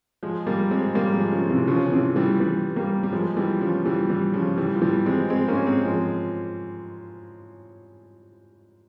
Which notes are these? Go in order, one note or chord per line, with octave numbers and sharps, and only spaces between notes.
F3 G#3
G3 A#3
G#3 C4
G3 A#3
F3 G#3
C#3 F3
C3 E3
C#3 F3
C#3
C3 E3
E3 G3
E3 G3
G3 A#3
G3
F3 G#3
E3 G3
C#3 F3
E3 G3
E3 G3
C#3 F3
E3 G3
F3
E3 G3
G#3 C4
G#3 C4
A#3 C#4
G#3 C4
F3 G#3